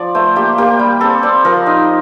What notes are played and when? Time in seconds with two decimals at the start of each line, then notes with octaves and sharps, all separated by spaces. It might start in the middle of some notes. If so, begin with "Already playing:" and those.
Already playing: F3 D5
0.15 A3 C5
0.36 A#3 G4
0.58 A#3 G4
0.79 G3
1.01 C4 A4
1.23 C4 D5
1.45 F3 A#4
1.66 D#4